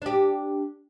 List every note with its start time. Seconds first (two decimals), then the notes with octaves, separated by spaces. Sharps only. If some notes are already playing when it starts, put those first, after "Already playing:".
0.02 D4 G4